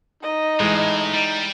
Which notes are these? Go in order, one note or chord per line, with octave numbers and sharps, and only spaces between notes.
D#4 D#5
A2 E3 G#3
G3